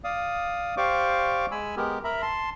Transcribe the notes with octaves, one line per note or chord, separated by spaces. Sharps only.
D5 F5 D#6
G4 C5 D5 F5 C#6 D6
G#3 G#5 B5 E6
G#3 B3 G4 A#4
A#4 E5 A#5 B5
A5 C6